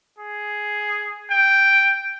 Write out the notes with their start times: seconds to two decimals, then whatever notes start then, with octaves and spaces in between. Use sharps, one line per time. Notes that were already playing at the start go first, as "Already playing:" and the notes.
0.18 G#4
1.30 G5